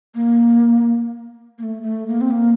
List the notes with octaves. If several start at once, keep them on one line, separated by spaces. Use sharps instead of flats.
A#3
A#3
A3
A3
A#3
C4
A#3